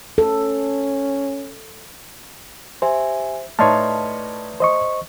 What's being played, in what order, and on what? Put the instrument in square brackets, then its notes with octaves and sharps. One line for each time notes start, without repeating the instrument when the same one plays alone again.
[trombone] C#4 [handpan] A4
[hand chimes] G4 E5 G#5 [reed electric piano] C5
[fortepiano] A2 D#4 C#5 [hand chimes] B4 D5 F6 [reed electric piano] A5 C6
[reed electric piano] C5 D#5 C#6